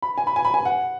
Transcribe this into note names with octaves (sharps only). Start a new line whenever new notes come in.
B5
G#5
B5
G#5
B5
G#5
F#5